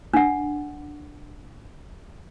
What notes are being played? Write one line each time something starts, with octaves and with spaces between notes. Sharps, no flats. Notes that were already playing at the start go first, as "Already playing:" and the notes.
D4 F#5